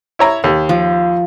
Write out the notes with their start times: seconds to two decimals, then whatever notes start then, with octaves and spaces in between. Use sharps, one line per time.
0.19 E4 C#5 A#5
0.44 D#2
0.69 F3